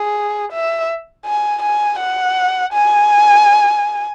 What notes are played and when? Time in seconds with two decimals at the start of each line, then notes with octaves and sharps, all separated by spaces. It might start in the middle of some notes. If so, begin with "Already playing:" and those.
Already playing: G#4
0.52 E5
1.25 G#5
1.62 G#5
1.99 F#5
2.73 G#5